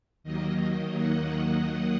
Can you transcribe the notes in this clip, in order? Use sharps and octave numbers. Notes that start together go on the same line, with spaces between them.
D#2 D#3 F#3 A#3 D#5
F#5